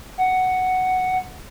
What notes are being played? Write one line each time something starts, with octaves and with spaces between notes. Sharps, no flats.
F#5